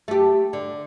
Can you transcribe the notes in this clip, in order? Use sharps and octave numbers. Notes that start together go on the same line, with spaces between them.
A3 G4
D3